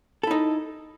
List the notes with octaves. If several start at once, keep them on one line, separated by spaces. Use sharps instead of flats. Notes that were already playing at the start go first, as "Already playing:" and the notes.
D#4 E4 A4